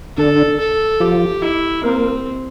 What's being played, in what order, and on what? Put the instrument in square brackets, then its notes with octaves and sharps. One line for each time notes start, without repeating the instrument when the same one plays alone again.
[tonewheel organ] D3 D4 [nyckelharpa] A4
[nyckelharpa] A4
[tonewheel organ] F3 F4 [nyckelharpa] G4
[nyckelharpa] E4
[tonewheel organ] A#3 A#4 [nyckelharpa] C4